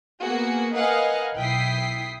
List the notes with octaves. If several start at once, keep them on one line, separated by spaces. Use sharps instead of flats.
A#3 B3 F#4 G#4
A#4 B4 D#5 F5 F#5 G#5
B1 E4 G5 D#6 B6 C7